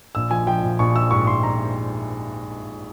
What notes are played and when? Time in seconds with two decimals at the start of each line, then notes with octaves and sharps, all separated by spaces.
0.15 A#1 E6
0.31 F3 G#5
0.47 F3 G5
0.63 A#1
0.79 A#1 C#6
0.95 F3 E6
1.11 G#2 C#6
1.27 G#2 C6
1.43 A#5